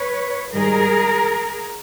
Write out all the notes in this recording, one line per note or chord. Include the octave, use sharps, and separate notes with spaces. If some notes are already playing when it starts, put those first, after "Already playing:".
Already playing: B4 C#5
G#2 D#3 G3 G#4 A#4